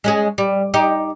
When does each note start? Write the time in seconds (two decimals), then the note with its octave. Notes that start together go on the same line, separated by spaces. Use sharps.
0.04 G#3 C#4 G#4
0.38 G3
0.74 D#4 G4